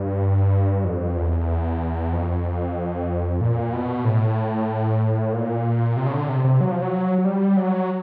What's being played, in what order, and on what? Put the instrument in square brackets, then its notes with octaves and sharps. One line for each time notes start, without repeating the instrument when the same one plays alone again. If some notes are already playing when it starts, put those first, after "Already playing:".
Already playing: [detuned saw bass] G2
F2
E2
F2
A#2
B2
A2
A#2
C3
C#3
D3
C3
C3
F#3
F3
F#3
F#3
G3
F#3